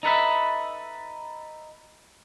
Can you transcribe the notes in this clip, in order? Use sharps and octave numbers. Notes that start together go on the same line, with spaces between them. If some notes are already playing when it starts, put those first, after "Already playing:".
D#4 A4 B4 E5